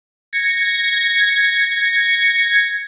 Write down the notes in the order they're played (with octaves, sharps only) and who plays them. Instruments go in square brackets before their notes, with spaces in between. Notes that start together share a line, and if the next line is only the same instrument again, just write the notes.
[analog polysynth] G#6 A#6 C#7